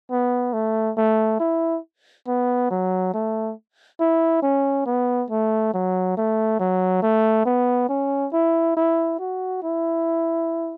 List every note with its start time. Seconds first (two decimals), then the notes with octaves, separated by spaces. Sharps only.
0.11 B3
0.53 A3
0.97 A3
1.40 E4
2.27 B3
2.71 F#3
3.14 A3
4.00 E4
4.43 C#4
4.86 B3
5.30 A3
5.74 F#3
6.17 A3
6.59 F#3
7.02 A3
7.46 B3
7.89 C#4
8.33 E4
8.77 E4
9.19 F#4
9.63 E4